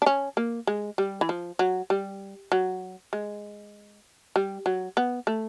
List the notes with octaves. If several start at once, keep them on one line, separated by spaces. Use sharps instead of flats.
D4
C#4
A#3
G#3
G3
E3
F3
F#3
G3
F#3
G#3
G3
F#3
B3
A3